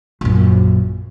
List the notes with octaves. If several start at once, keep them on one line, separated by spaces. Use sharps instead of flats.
A#1 F#2